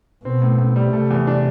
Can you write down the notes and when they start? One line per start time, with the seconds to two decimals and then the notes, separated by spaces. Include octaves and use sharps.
0.25 B2 C4
0.42 A2
0.58 A2
0.76 G3
0.93 C3 A3
1.10 E2
1.27 D4